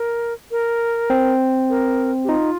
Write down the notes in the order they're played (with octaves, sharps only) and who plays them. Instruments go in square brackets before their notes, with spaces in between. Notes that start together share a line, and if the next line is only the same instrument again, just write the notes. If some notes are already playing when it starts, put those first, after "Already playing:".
Already playing: [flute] A#4
A#4
[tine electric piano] C4
[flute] A#4
G4
[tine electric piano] D#4 [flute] F4